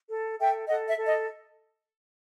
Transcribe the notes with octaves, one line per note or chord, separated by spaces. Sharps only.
A4
A4 E5 G5
A4 D#5 F#5
E5
A4
D#5